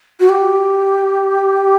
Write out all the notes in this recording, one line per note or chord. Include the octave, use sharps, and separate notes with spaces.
F#4
G4